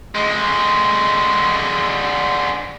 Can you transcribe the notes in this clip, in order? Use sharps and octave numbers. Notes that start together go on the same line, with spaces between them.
D3 G#3